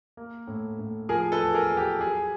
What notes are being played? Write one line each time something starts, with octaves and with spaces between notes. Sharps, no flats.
A#3
A2
A2
F3 G#4 A#4
A4 B4
E2
G#4 A#4
E2
G4 A4
F#3 G#4